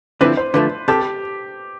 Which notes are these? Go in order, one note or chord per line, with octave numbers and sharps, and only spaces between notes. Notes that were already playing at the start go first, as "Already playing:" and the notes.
D3 F3 C4 E4 B4
C5
D3 F3 A3 B4
C3 G4 A4